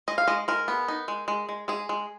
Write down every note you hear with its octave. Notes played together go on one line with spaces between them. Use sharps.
G#3 D#5
F5
G#3 D#5
G#3 A#4
B3
D#4
G#3
G#3
G#3
G#3 G#4
G#3